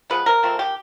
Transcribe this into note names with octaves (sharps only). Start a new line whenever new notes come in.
F3 G#3 B3 B4
C3 A#4
F3 A3 C4
D#3 G4